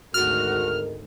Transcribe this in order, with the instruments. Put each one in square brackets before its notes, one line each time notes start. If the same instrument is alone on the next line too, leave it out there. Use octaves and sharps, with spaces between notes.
[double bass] G#1 D2 [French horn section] G#3 A3 A#4 [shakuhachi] F#4 [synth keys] F6